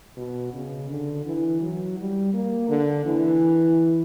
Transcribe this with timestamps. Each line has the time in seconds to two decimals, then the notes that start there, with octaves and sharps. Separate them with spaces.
0.17 B2
0.54 C#3
0.89 D3
1.26 E3
1.62 F#3
1.98 G3
2.34 A#3
2.69 D3
3.05 E3